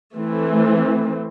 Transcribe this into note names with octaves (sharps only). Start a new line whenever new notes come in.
E3 A3 C4